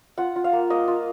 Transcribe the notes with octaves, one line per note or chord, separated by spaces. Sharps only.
F4 F#5
F4
F5
A#3
A#3 D#5
F4